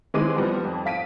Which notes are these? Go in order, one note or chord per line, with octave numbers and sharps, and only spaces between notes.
D#3 E3 G#3 C4 D6 D#7
F3 G3 B3
F2
F5 B6 D7 D#7